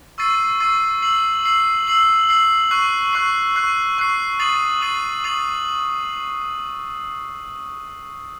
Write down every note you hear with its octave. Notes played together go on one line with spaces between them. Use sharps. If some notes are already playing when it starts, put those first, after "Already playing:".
C#6 E6 A6 C7 D#7
C#6 E6 A6 C7 D#7
E6 C7 F#7
E6 C7 F#7
E6 C7 F#7
E6 C7 F#7
C#6 F#6 C7
C#6 F#6 C7
C#6 F#6 C7
C#6 F#6 C7
D#6 A6 C7 D#7 F#7
D#6 A6 C7 D#7 F#7
D#6 A6 C7 D#7 F#7